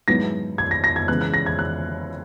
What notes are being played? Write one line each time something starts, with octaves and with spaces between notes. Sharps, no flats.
G#2 F#3 B3 E4 A#6
G#6
A#6
A#6
G#6
C#3 E3 G#3 B3 F#6
F#6
A#6
G#6
F#6